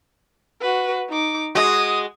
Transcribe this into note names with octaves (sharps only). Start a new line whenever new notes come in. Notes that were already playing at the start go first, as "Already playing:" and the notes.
F#4 B4
D#4 D6
G#3 F#4 D#6